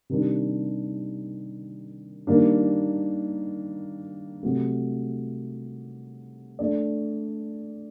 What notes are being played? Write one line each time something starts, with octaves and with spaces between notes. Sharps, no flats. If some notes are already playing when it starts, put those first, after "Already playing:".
C3 D#3 G3 D4
D#3 G3 A#3 D4
C3 F#3 A3
A3 D4 A4 D5